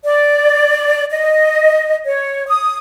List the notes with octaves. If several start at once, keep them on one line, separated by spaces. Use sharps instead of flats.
D5
D#5
C#5
D#6